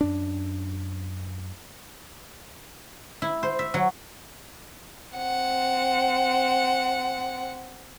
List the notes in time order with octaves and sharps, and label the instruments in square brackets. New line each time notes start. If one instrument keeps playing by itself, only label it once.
[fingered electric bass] F#2 D4
[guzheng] E4
C5
E5
F#3
[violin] C4 F#5